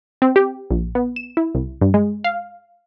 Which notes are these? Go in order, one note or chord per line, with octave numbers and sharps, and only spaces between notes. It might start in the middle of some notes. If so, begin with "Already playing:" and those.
C4
G4
A#1
B3
E7
E4
C2
G2
G#3
F5